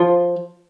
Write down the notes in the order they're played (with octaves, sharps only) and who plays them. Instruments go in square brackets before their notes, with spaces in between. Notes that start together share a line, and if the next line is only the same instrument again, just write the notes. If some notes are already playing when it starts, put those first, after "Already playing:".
Already playing: [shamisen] F3 F4